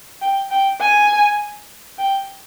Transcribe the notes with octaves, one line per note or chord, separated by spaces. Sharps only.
G5
G5
G#5
G5